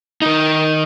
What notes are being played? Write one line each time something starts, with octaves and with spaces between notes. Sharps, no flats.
D#3 D#4